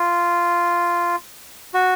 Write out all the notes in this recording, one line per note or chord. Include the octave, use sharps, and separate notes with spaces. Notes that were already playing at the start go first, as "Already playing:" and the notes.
Already playing: F4
F#4